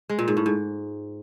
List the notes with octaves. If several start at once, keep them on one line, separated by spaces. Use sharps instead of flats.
G#3
A#2
G#2
A2
G#2